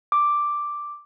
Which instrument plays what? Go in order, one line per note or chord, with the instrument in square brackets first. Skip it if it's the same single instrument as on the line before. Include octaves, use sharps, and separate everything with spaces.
[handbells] D6